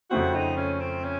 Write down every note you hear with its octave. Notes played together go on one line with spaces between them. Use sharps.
F2 C#3 A3 C4 F#4
D#4
C#4
C4
C#4